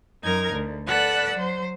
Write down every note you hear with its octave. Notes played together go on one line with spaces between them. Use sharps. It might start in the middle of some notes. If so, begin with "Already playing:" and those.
F#2 D#4 A#4 G#6
D2
A4 B4 D5 F#5 E6 F#6
F#3 C5